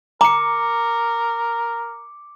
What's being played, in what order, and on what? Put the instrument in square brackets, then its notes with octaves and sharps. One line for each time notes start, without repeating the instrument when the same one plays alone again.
[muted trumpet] A#4 [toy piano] A#5 [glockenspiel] D6 C#7